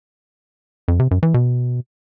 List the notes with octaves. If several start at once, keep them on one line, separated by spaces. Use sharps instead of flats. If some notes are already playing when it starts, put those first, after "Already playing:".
F2
C3
F#2
E3
B2